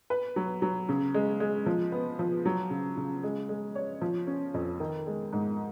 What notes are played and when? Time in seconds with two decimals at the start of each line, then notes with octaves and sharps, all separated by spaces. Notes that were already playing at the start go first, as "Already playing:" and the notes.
0.10 B4
0.36 F#3
0.62 F#3
0.89 C#3
1.14 G#3
1.40 G#3
1.66 F3
1.92 B3
2.19 F3
2.46 F#3
2.70 C#3
2.97 C#3
3.23 G#3
3.49 G#3
3.75 C#5
4.01 F3
4.27 C#4
4.54 F2
4.80 D#3
5.07 G#3
5.33 G#2